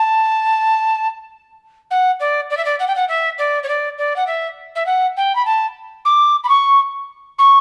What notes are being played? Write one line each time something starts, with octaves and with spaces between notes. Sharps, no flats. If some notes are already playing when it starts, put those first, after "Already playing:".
Already playing: A5
F#5
D5
D5
E5
D5
F#5
G5
F#5
E5
D5
C#5
D5
D5
F#5
E5
E5
F#5
G5
B5
A5
D6
B5
C#6
C#6